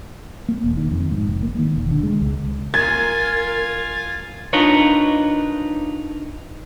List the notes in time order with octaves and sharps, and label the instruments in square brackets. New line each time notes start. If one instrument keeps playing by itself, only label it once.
[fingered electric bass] A#3
E1
D#3
F2
G#2
F1
A#3
D#3
E1
D3
G#3
C#2
[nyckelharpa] F4 G#5 [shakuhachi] A#4 [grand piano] G#6 [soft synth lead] A6
[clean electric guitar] D4 D#4 F4 A#4 B4 C#5